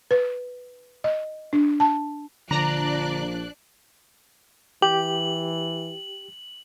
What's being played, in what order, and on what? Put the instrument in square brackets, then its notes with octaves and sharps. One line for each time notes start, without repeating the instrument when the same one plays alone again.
[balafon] B4
D#5
D4
A5
[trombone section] A#1 F3 [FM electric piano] D3 [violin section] D4 D5 F#6 [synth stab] A#5
[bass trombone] E3 [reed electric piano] G4 [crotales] F#7